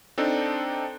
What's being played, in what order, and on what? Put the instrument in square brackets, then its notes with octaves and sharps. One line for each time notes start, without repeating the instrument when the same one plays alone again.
[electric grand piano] C4 D4 D#4 A4